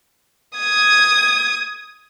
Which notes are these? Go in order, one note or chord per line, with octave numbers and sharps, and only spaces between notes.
D#6 G#6